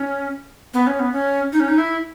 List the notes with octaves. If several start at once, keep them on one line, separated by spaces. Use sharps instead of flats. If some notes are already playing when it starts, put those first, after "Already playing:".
Already playing: C#4
B3
C#4
B3
C#4
D#4
C#4
D#4
E4